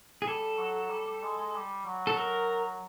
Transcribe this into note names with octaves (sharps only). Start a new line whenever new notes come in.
G#4
G3 A4
F#3
G3
G3
G#3
G#3
G3
F#3
A4
A#4